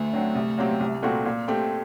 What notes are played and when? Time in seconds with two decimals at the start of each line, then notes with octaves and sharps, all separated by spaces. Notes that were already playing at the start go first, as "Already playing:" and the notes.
Already playing: D2 A3
0.13 D3 F#3 C4
0.35 C2
0.58 A#2 F#3 C4 G4
0.80 C2
1.03 A#2 A3 C4 F#4
1.25 A#2
1.48 A3 C4 G4